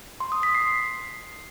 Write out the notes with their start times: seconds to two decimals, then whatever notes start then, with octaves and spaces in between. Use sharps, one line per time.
0.20 C6
0.32 D#6
0.43 B6
0.55 C7